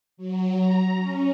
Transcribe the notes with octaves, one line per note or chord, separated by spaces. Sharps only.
F#3
A#5
C#4